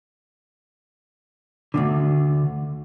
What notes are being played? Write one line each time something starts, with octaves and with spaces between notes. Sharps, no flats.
D2 G2 D3